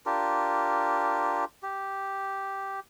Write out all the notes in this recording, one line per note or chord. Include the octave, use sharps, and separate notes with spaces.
D4 F4 G4 A#4
G4